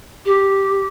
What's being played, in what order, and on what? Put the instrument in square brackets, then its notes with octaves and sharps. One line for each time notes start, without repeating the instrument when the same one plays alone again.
[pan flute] G4